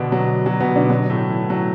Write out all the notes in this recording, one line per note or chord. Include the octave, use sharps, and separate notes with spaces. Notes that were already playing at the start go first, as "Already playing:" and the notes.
Already playing: B2 D3 B3 D4
F#3
F#3
B2 B3
D3 D4
F#3
A2 A3
E3
F#3